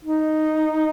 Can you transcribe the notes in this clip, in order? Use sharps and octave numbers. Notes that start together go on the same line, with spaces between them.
D#4